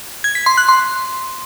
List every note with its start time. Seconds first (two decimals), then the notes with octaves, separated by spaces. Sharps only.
0.24 G#6
0.35 B6
0.46 C6
0.57 F#6
0.69 C6